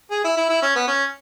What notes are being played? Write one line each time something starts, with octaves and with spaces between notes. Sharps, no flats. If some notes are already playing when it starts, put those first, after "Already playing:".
G#4
E4
E4
E4
C#4
B3
C#4